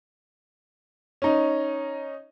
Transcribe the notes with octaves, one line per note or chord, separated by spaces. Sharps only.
C#4 D#4